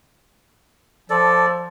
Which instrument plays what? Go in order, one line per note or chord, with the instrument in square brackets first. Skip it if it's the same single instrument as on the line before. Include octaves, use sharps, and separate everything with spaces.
[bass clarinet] F3 [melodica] A4 D5